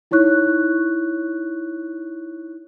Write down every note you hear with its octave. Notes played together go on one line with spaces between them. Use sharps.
D#4 E4 C#5 C#6 F#6